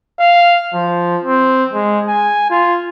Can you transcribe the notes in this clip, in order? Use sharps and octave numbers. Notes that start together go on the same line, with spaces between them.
F5
F3
C4
G#3
G#5
F4